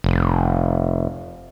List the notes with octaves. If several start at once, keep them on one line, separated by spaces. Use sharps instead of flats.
F1